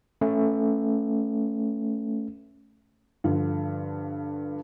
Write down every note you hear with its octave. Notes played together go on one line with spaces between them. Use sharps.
A3 C#4
G2 D3 F3